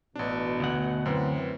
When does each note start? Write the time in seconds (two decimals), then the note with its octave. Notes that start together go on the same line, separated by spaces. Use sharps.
0.16 A1 B2 D4
0.60 D2 F#5
1.06 F#2 E3 C4 B4